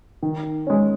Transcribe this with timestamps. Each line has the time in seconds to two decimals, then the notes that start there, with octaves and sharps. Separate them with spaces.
0.23 D#3
0.67 G#3 C#4